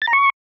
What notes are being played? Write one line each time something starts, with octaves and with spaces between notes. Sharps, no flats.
A6
A#5
C#6